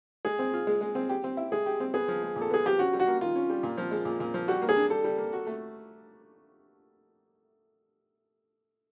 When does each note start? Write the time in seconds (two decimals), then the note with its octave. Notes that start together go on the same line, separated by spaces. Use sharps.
0.25 G#3 G#4
0.39 C4
0.53 F4
0.67 G#3
0.81 G#3
0.95 C4
1.09 G4
1.24 C4
1.37 E4
1.52 G#3 G#4
1.66 G4
1.80 C4
1.94 B3 G#4
2.08 F3
2.23 G#3
2.36 A#2
2.41 A4
2.50 B3 G#4
2.65 F3 G4
2.79 C#4 F#4
2.93 G3
3.00 F#4
3.07 A#3
3.21 D#3 F4
3.36 C#4
3.50 G3
3.63 A#2
3.77 F3
3.91 G#3
4.05 A#2
4.20 A#2
4.34 F3
4.48 G3 F#4
4.62 A#3
4.69 G#4
4.76 D4
4.90 G3 A4
5.04 G3
5.18 A#3
5.33 F#4
5.47 A3